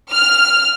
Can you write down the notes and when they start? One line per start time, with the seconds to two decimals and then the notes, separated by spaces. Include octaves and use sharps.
0.10 F6